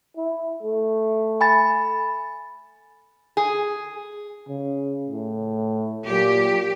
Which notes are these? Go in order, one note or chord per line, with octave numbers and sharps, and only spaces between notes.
E4
A3
G#5 B5 A6
G#4
C#3
A2
A#2 F#3 G4